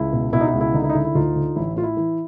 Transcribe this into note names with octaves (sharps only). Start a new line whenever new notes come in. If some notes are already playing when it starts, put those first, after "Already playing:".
Already playing: C#2 E4
B2
B2 E4
D#4
E4
C#2
E4
D3 D#4
E4
D#4
D3 E4
E4
D2 D#4 F4
D3
A1 E4
A2 F4
E4
E3